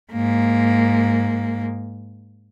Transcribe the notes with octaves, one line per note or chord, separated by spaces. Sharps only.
G#2 A#3